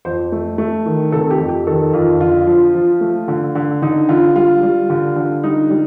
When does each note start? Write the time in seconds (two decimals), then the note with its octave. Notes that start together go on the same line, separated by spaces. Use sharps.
0.05 F2 C5
0.32 A3
0.58 A3
0.86 D#3
1.12 C3 A4
1.30 G4
1.39 F2
1.49 G4
1.67 D#3 A4
1.93 F2 F4
2.20 D3 F4
2.47 F3
2.75 F3
3.01 A3
3.28 D3
3.55 D3
3.82 D3 D#4
4.09 D3 F4
4.36 G3 F4
4.63 G3
4.90 D3
5.16 D3
5.43 G3 D#4
5.70 G3